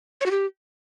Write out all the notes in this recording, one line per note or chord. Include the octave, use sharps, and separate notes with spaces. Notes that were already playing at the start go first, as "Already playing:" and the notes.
C#5
F#4
G4